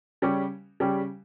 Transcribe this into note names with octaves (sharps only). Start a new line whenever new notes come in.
C#3 G3 C#4 G4
C#3 G3 C#4 G4